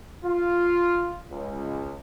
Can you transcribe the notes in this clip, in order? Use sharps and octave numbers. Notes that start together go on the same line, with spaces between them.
F4
C#2